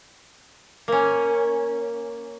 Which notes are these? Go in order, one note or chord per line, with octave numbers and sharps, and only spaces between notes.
A#3 C#4